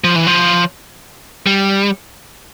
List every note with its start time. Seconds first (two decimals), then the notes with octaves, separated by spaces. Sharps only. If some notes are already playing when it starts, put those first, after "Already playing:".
0.04 F3
0.16 E3
0.27 F3
1.46 G3